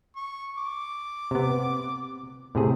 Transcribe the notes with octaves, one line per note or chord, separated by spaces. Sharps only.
C#6
D6
C3 B3
A2 C3 G#4